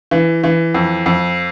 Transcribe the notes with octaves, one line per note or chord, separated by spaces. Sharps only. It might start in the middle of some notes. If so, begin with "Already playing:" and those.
E3
E3
F2
F2